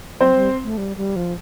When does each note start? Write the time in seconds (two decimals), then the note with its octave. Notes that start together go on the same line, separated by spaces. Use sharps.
0.20 F#3 C4 C5
0.35 G3
0.64 A3
0.78 G3
0.97 G3
1.16 F3